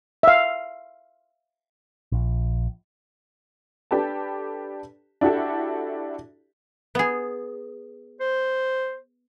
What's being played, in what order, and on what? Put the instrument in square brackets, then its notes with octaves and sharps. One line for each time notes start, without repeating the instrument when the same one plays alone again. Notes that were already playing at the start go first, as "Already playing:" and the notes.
[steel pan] E5 F5
[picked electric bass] A#1
[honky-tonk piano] D4 G4 A4 B4 A5
D4 E4 F#4 G4 A4
[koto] B3 G#4
[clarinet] C5